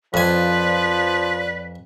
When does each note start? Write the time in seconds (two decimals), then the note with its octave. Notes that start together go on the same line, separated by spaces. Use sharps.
0.14 F2 F3 B4 D5 G#5